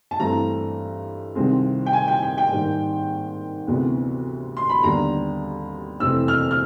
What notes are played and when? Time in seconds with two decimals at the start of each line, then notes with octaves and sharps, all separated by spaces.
0.11 A5
0.19 G2 E3 A3 C4 A#5
1.35 C2 C3 D#3 G#3 C4
1.86 G5
1.93 G#5
2.08 G5
2.23 G5
2.38 G5
2.51 G#2 D#3 G3 A#3
3.67 D2 C3 E3 G#3 B3
4.57 C6
4.69 B5
4.83 D#2 D3 G3 B3 A#5
6.00 F2 C3 E3 A3 C4 E6
6.28 F6
6.51 F6